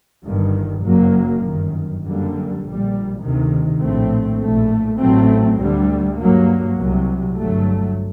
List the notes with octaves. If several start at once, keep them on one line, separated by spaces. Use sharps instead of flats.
G1 G2 D#3
F#1 F#2 F#3 A#3
G1 F#2 D#3
F#2 D3 G3 A#3
A#1 A#2 G3
D2 C3 D#3
A#1 A2 A3 C4
A#1 A2 A3
A1 A2 F#3 A3 C4
D2 D3 G3
G2 F#3 A#3
C2 C3 F#3
G1 G2 F#3 A3